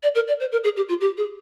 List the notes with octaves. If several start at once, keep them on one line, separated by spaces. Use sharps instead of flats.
D5
A#4
D5
C5
A#4
G#4
G4
F4
G4
G#4